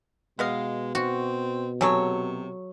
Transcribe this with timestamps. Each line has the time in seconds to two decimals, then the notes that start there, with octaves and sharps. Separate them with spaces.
0.39 B2 G#3 B3 D#5 F5
0.95 C4 F#4
1.81 C3 F#3 G#4 A4 C#5